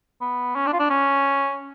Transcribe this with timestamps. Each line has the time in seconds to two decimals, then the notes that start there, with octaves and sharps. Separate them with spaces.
0.21 B3
0.56 C#4
0.67 D4
0.73 F4
0.79 D4
0.90 C#4